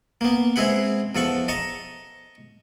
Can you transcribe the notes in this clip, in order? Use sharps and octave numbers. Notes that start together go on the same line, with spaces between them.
A#3 B3
G#3 C4 E4 G#4 B4 F#5
E2 F3 A4 F#5 C#6
D#5 A5 A#5 C#6